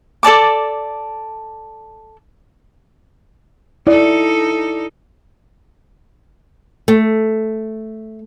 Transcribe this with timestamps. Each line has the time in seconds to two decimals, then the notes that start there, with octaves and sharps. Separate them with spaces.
0.23 A4 D5 A5 D6
3.87 D#4 E4 A4 D5
6.88 A3